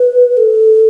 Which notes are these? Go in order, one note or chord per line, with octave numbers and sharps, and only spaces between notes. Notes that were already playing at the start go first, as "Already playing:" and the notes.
Already playing: B4
A4